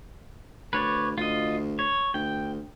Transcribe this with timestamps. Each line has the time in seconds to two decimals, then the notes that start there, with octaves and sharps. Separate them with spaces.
0.73 D2 B4 C#5 D5
1.18 D2 F4 D#5
1.79 C#5
2.14 D2 G5